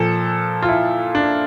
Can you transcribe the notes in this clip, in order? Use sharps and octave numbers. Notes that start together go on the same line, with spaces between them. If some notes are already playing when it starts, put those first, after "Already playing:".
Already playing: A#2 F3 A4
F4
E4
D4